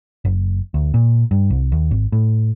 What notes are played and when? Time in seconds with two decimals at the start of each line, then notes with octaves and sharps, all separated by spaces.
0.25 F#1
0.74 D2
0.94 A#2
1.31 G2
1.50 C2
1.72 D#2
1.91 G#1
2.12 A2